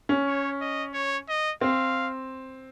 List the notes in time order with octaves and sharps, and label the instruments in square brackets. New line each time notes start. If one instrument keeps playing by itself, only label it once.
[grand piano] C#4
[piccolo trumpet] C#5
D#5
C#5
D#5
[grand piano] C4 [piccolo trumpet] F5